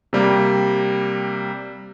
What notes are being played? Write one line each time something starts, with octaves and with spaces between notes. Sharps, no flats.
C3 G3 A#3